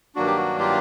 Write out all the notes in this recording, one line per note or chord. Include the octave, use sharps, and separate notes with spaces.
G2 D#3 F#3 A#3 D4 F#4
G4
F#4
F4 G4